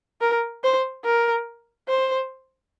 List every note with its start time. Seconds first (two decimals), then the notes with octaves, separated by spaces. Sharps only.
0.21 A#4
0.64 C5
1.05 A#4
1.89 C5